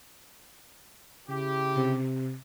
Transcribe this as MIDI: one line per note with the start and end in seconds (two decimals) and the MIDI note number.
1.28 1.98 49
1.28 1.98 64
1.28 1.98 67
1.77 2.36 48